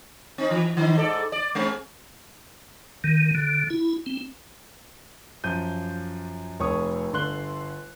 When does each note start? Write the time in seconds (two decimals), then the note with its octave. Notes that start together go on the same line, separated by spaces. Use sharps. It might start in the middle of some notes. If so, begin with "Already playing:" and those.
0.38 C4 D#4
0.51 E3
0.77 D#3 D#4
0.96 G#2 A4 D5
1.32 D5
1.55 G#3 C4 C#4
3.04 D#3
3.35 D3
3.70 E4
4.06 C4
5.44 F#2 F3 G6 D#7
6.60 F1 F2 C#5 C#6 D#6
7.13 G1 D3 C6 F#6 G7